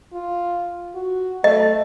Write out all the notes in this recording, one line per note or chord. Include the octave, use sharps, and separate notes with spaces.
F4
F#4
A3 D#5